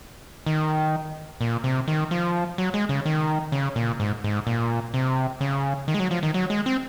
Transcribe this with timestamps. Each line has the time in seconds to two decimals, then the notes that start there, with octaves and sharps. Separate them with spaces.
0.46 D#3
1.41 A#2
1.64 C3
1.88 D#3
2.11 F3
2.58 F#3
2.74 G#3
2.89 C#3
3.06 D#3
3.52 C#3
3.76 A#2
4.00 G#2
4.24 G#2
4.47 A#2
4.94 C3
5.41 C#3
5.88 D#3
5.94 G#3
6.00 F#3
6.11 F3
6.23 D#3
6.34 F#3
6.50 G#3
6.66 C4